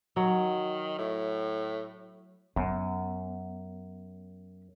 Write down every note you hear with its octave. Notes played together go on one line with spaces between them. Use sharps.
D#3 F#3
A2
F#2 B3